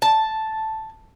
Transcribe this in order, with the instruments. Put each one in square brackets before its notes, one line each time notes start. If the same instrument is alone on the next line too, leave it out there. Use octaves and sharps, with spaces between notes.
[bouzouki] A5